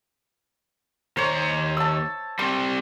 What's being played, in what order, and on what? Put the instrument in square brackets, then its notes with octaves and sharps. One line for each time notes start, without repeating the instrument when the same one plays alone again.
[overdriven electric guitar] D#2 A#5 [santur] C5 C#5
[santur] A5 E6
[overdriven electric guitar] G3 C4 [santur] C6